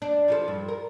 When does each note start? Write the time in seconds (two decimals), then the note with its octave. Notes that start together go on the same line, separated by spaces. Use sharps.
0.02 D4
0.28 F3 F4 A4
0.48 G2
0.68 A#4